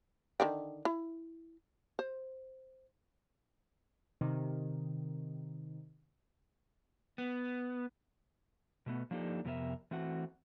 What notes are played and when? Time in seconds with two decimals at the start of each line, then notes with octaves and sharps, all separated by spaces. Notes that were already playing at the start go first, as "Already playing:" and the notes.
0.40 D3 D#3 G5
0.85 E4
1.99 C5
4.21 C3 D#3
7.18 B3
8.86 B2 A3 B3
9.11 F3 A#3 D4 D#4 G4 A4
9.45 F2 C3 B3 A#4 E5
9.91 E3 A3 C4 F#4 F#5